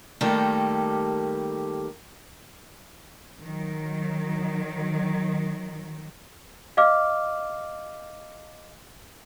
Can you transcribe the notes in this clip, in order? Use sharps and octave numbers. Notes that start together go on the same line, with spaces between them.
D#3 G3 A3 A#3 G4 A4
D#3 F#3
D#5 F5 D6 F6